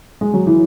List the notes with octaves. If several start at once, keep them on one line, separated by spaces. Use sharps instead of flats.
G#3
F#3
E3